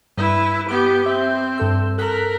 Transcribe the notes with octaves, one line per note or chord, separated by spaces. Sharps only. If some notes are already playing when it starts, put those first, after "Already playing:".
G2 E4 B4
B3 G4 D6
C4 E5
G2 A4 E6
A4 A#4 F#6 B6